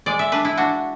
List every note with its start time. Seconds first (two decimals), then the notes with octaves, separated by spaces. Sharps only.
0.06 G#3 D5
0.19 E5
0.32 D4 B4
0.45 E4
0.57 D4 F#4